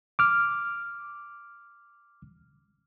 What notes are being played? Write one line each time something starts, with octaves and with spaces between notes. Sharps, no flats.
D6 F6